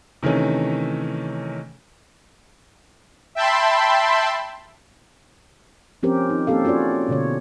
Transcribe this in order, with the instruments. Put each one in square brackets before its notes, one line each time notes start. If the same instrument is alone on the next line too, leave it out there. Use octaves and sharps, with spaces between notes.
[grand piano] C3 D#3 E3 A3 C#4
[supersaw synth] E5 G5 A5 B5 C6
[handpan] F3 C4 C#4 G4 A#4 C5
D#4
A#3 C4 C#4 G4 A4 F5
C#4 F4 F#4 C#5 D5
B2 D3 C#5